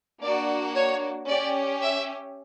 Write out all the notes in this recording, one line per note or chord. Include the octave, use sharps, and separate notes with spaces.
A#3 D4 F#4 D5
C#5
C#4 G4 D5
E5